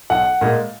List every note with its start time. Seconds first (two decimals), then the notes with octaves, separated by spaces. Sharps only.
0.10 B1 F#5
0.41 A#2 G#3